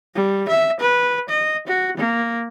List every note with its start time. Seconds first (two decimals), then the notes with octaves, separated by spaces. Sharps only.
0.15 G3
0.49 E5
0.80 B4
1.29 D#5
1.67 F#4
1.97 A#3